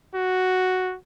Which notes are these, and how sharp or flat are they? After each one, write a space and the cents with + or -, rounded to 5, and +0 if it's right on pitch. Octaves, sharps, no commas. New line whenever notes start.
F#4 +0